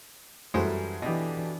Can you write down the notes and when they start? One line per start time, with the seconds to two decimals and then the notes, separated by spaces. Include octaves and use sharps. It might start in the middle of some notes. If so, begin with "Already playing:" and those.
0.54 F#2 E3 G3 G#3 E4 F#4 A4 C5
1.02 B2 E3 D4 G4 D#5